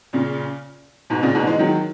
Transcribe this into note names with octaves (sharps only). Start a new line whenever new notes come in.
A#2 C#3
G#2 B2
A#2 C#3
G#2 B2
E3 G#3
D#3 F#3